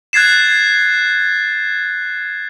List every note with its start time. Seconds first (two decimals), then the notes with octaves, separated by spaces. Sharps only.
0.13 F#6 G#6 A6 C7 E7